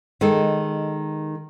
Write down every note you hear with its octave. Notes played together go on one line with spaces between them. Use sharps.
D#3 G#3 A4